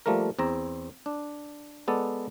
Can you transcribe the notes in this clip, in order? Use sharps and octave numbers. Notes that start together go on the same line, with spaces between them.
F3 G3 A3 A#3 A#4
E2 C4 A#5
D4
G#3 B3 A4 D5